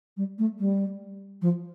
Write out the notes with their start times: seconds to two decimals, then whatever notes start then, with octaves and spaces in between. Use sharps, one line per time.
0.17 G3
0.38 A3
0.59 G3
1.42 F3